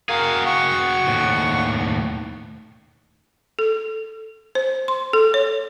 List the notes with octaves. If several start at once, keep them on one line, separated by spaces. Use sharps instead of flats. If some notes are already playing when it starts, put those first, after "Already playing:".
F#4 G#4 A#4 F5
F#5 C#6
D#2 A2
A4
C5
C6
A4
C#5